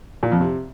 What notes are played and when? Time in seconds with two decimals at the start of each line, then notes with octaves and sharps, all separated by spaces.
0.23 A#2
0.32 F2
0.41 C3